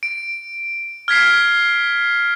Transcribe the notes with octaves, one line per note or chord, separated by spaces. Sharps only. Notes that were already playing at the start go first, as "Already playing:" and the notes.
D7
F6 G#6 B6 C7